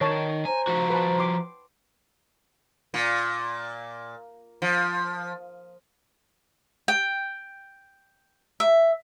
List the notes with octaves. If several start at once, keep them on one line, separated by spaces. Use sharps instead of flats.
D#3 C#5 A5
C5 G#5 A#5
F3 F#4
B4 A5
C6 D6
A#2
F3
G5
E5